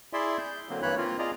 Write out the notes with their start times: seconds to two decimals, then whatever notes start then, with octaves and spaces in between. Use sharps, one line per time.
0.13 E4 G#4 D5 E5 C6
0.38 G6
0.69 D3 F#3 A#3 C4
0.82 G2 E3 A#3 C#5 B5 F#6
0.98 A#3 C4 F4 A#4
1.19 F4 G#4 D5 D#5 A#5